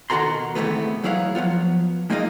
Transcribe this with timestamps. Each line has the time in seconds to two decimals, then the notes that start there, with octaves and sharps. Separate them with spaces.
0.10 B2 D#3 F#4 A4 A#5 C6
0.55 G#2 C3 D#3 E3 A3 B3
1.04 E3 F#3 E4 G#4 C#5 F5
1.35 F3 F#3 B3 F4
2.10 G#3 A#3 D#4 F4 D#5 F5